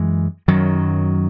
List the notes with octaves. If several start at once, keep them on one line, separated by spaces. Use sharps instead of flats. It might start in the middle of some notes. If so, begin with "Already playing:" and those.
Already playing: F#2 E3 G#3
F#2 D#3 F#3